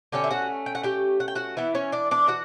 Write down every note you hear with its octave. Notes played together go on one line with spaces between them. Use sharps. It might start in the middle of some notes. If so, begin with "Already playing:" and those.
D3 A3 C#4 G4 G5
E5
F#4 F#5
G5
F#5
G4 G5
F#5
G5
F#4 F#5
E3 B3 E4 E5
C#4 C#5
D4 D5
D4 D5
F#4 F#5